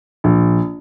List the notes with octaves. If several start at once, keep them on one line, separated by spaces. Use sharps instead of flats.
A#1